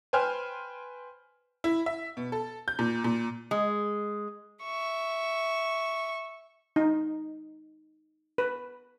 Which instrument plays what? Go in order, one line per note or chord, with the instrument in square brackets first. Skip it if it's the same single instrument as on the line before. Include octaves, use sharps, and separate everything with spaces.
[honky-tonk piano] B4 C5 G5 G#5 C6 F6
E4
E5
B2
A4
G6
A#2
A#2
[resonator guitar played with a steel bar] G#3
[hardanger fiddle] E5 C#6
[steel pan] D#4
B4